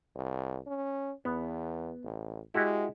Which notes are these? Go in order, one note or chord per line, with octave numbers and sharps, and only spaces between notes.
C2
C#4
E2 B3
A1
G#3 E4 F#4 G4